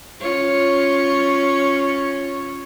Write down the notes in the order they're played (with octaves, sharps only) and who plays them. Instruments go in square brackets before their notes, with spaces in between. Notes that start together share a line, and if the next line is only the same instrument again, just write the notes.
[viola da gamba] C#4 F4 C#5